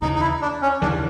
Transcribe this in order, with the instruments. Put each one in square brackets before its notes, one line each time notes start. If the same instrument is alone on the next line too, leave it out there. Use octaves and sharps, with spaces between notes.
[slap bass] D#2 C#3 E3 [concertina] D#4
[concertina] D#4
E4
D4
C#4
[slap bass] D#2 C#3 E3 [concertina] D4